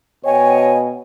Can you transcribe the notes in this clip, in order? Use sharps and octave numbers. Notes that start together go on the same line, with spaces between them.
B2 C#5 D#5 G5 G#5